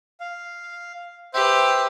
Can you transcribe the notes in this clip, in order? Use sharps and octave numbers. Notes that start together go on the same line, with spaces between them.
F5
G4 B4 C5 E5